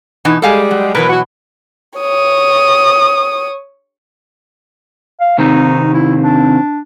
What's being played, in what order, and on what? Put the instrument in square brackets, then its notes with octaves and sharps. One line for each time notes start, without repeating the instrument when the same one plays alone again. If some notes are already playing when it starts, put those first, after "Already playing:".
[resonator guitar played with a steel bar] B2 E3 D#4
[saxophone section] G3 G#3 [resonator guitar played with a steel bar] A4 F5 G#5
[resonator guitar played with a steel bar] F#3
[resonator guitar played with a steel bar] B2 E3 F#3 [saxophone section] A#4 B4
[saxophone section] F#4
[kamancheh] C#5 D#6
[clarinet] F5
[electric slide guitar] C3 D#3 C4 [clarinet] D#4
[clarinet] E4
D4